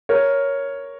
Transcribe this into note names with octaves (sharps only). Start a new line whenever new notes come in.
A#4 C#5